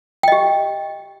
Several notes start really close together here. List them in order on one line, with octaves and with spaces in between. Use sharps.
G5 D#5 G4